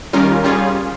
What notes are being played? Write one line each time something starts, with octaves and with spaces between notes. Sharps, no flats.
D#3 G3 C#4 F4 A#4
G3 C#4 F4 G#4